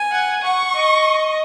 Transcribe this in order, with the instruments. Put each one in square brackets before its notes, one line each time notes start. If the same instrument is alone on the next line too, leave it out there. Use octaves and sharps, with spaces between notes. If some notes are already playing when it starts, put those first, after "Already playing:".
Already playing: [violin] G#5
[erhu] F#5
[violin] F#5 [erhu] C#6
[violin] D#5